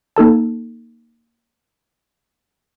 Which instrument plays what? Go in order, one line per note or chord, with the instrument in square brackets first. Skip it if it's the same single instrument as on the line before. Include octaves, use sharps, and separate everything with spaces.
[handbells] A#3 D#4 A4 A5